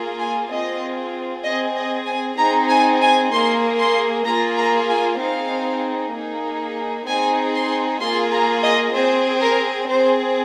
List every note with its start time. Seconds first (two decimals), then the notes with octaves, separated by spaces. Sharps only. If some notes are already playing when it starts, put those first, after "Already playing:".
Already playing: A#3 F4 G#4
0.19 G#5
0.50 C4 F4 G#4 D#5
1.44 C4 G#4 D#5
1.76 D#5
2.07 G#5
2.38 C4 D#4 G#4 A#5
2.70 G#5
3.01 G#5
3.32 A#3 G#4 C6
3.79 C6
4.25 A#3 F4 G#4 A#5
4.57 A#5
4.88 G#5
5.19 C4 D#4 G#4 F5
6.14 A#3 D#4 G#4
7.07 C4 D#4 G#4 G#5
7.54 C6
8.01 A#3 F4 G#4 C6
8.32 A#5
8.63 D#5
8.94 C4 G#4 C5
9.41 A#4
9.89 C4 G#4 C5